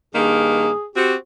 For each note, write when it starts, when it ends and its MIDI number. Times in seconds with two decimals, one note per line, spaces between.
0.15 0.71 43
0.15 0.71 51
0.15 0.71 58
0.15 0.87 68
0.96 1.15 60
0.96 1.15 66
0.96 1.15 67